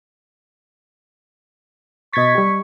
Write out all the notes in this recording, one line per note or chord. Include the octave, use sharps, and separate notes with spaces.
B2 D#5 C#6 G#6 A6 B6
G3 G4